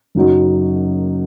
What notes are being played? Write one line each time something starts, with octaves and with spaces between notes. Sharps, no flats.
F#1 F#2 F#3 D#4 F#4